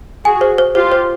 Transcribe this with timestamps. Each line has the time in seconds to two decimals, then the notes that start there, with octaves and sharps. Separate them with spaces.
0.25 F#4 G#4 G#5
0.41 C5
0.58 C5
0.75 F4 G4 C5
0.92 C5